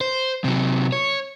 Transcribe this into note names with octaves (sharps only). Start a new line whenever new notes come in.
C5
C3 F#3
C#5